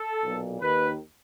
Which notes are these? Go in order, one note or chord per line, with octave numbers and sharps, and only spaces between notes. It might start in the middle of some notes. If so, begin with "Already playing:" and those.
Already playing: A4
B1 A#2
D#2 D#3 B4